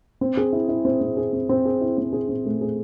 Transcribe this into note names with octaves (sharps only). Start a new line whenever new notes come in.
C4
G#4
E4
E4
C4
C4
G#4
C4
C4
G#4
E4
C4
G#4
C4
A3
G#4